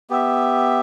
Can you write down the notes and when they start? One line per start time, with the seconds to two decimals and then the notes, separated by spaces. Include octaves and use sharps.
0.10 B3 G4 E5